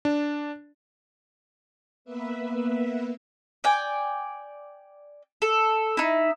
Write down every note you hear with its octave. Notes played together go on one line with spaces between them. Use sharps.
D4
A#3 B3 B4 E5
D5 G5 G#5
A4
D#4 E4